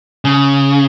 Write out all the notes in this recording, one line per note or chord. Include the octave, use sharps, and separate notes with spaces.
C#3